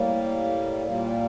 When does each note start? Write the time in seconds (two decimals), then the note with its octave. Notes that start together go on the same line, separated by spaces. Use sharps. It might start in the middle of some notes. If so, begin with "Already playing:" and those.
Already playing: A2 G3 A#3
0.86 A#2 G3 A#3